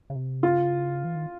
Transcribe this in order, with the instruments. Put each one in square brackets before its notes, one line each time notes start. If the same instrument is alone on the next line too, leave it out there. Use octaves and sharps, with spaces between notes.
[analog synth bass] C#3
C3
[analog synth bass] C#3 [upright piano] F4
[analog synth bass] E3
D#3